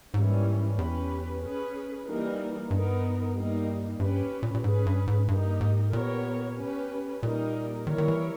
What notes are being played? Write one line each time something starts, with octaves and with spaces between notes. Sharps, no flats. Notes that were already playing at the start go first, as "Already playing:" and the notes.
G#2 E3 G3 A#3 C#4
E2 C#4 G4 B4
C#4 G#4 B4
E3 G3 A#3 D#4 A#4
G2 B3 D#4 A#4
G3 A#3 D#4
G2 C#4 G4 B4
A#2
A#2
G#2 C#4 G#4 B4
G2
G#2
G2 A#3 D#4 G4
G#2
A#2 B3 G4 A#4 C#5
C#4 G4 B4
A#2 G3 A#3 D#4 A#4
D#3 G3 A#3 E4 A#4 C#5
D#3
E3